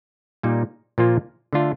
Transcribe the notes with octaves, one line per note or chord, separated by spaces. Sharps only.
A#2 G3 A#3 D#4
A#2 F3 A#3 F4
D3 A3 D4 F4